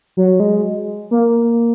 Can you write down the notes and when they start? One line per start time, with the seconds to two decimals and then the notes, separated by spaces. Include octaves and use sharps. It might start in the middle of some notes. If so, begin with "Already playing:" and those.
0.17 F#3
0.40 G#3
1.11 A#3